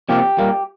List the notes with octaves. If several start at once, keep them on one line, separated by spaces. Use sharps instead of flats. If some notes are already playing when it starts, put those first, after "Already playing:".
C3 F3 A#3 G4
A#2 G3 A#3